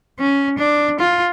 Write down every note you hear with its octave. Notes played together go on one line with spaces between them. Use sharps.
C#4
D4
F4